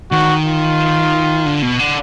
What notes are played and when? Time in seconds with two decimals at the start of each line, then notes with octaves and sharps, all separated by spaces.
0.12 D#3 F#4
0.45 F4
1.46 D3
1.62 B2
1.79 D3